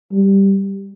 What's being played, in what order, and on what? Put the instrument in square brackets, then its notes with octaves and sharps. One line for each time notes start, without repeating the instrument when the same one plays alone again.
[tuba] G3